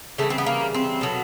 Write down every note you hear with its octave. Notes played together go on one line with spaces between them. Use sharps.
C#3 E3 G3 A3
C4
B3
A#3
C4
B2 F#3 A3